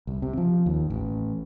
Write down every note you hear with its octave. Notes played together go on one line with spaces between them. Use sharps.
C2
C3
F3
D#2
A1